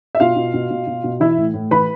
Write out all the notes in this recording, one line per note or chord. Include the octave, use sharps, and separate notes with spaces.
E5
B2 F4 F5
B2
B2
B2
B2
B2
E3 E4 E5
A2
A2
E3 B4 B5